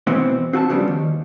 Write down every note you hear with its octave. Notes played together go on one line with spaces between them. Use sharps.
B2 E3 B3 C4 E4 C5
C4 F#4 G#5 A5
F2 C#3 F3 G3 B3 D4
D#2